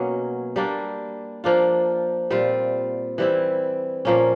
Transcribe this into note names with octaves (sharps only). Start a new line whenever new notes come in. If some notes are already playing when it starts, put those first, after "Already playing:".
Already playing: B2 F#3 A#3 C#4
G3 A#3 D4
F3 A#3 D4 F4
A#2 G3 C4 F4
E3 G3 C4 E4
A#2 F3 A#3 C#4